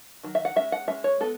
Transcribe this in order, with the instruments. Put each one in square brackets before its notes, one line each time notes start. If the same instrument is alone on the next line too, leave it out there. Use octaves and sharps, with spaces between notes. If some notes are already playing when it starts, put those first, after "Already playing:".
[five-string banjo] D#3 F#3
E5
F#5
G#3 C#4 E5
F#5
G#3 C#4 E5
C#5
G#3 B3 A4